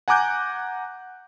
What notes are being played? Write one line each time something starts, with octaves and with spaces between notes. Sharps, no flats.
F#5 G#5 A#5 D6 F#6 G6